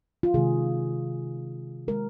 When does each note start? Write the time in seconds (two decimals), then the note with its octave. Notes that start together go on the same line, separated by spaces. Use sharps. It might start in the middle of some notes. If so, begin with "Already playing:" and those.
0.23 F4
0.34 C3 D#3 G#3 G#4
1.88 D#3 G#3 A#4